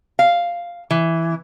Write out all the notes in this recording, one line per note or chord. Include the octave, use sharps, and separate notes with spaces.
F5
E3